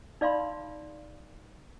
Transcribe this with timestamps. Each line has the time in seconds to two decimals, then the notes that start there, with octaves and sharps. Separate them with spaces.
0.21 D#4 D5 F5 B5 C6